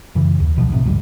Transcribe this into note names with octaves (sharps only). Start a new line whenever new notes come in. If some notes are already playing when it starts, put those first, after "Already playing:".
F#2 C#3 E3
D#2
B1 B2 E3 F3
G1 A2 C3
F#1 D2 G#2 G3